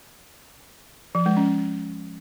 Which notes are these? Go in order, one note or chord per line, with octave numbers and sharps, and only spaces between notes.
F3
G#3
C#4